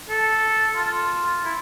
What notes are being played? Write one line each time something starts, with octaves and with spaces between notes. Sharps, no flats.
A4
F4
E4